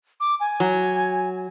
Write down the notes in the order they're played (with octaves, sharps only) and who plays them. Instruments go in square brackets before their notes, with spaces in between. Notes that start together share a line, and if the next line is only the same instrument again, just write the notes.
[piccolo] D6
G#5
[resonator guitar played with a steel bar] F#3